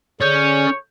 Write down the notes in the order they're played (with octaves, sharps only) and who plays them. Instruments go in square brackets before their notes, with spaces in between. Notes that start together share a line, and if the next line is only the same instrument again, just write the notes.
[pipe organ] D3 G#4 D5 [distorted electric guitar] C#4 [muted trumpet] C#5 [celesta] G6 G#6